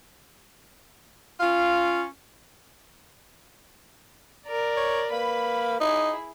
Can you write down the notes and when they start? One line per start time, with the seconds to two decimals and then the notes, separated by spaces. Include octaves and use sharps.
1.40 C#4 F4
4.46 A#4 D5
4.77 C#5
5.12 A#3 B4 B5
5.80 D#4 E4 G#4